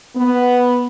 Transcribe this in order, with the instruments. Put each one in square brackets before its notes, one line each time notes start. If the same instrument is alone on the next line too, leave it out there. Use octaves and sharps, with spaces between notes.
[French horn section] B3